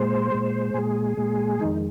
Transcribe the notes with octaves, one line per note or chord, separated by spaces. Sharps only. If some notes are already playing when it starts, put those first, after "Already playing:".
Already playing: A#2 G#3 C5
A#2 G#3
A#2 G#3 G#4
A#2 G#3
F2 D#3 G#3 D#4